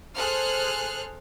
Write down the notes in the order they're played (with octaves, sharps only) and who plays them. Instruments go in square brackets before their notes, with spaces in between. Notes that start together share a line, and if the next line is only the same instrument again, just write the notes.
[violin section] G#4 A4 C5 F6 F#6